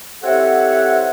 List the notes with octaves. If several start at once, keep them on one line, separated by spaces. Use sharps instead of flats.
C4 E4 G4 A4 C#5 F#5